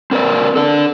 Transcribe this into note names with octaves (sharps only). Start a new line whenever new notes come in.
C4 A#4 B4 D5
D4 A4